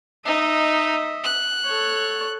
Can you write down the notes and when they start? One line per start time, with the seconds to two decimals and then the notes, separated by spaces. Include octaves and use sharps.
0.25 D#4 D#5 E5
1.24 F#6
1.65 A4 C#5